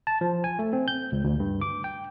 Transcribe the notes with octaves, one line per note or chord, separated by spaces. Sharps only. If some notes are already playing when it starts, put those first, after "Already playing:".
A5
F3
G#5
A3
C4
G6
C#2
D2
G2
D6
G5